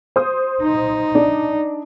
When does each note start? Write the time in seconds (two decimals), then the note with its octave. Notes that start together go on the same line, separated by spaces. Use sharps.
0.16 C5 D#6
0.62 D#4
1.15 D4